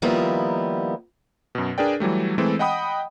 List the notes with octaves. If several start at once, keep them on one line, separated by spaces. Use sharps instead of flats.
D#3 F3 G3 A#3 B3 E4
F#2 B2
D4 G#4 A#4 B4 D5 G5
E3 F#3 G3 A3
E3 G#3 A3 C4 A4
D#5 F#5 G5 B5 D#6